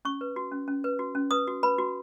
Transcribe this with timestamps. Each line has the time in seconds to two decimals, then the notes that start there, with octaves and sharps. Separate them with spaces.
0.05 C#4 C#6
0.21 B4
0.36 F#4
0.52 C#4
0.68 C#4
0.84 B4
0.99 F#4
1.15 C#4
1.31 B4 D#6
1.47 F#4
1.63 B4 B5
1.79 F#4